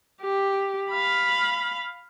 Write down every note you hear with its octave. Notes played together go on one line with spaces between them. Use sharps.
G4
F5 B5